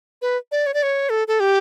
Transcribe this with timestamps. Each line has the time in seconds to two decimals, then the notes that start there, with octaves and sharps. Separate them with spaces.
0.22 B4
0.52 D5
0.66 C#5
0.74 D5
0.83 C#5
1.10 A4
1.28 A4
1.40 G4